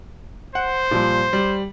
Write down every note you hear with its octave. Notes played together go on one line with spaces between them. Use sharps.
C5 F#5
A#2 F3 G3
G3